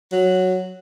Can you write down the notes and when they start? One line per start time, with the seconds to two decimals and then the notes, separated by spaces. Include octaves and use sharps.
0.12 F#3